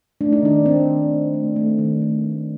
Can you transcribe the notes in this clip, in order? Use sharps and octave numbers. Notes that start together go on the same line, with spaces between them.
A3 D4
D#4
D#3 D4
A3 C4
D#3
D#3
A3
A3
D#3
A3
A3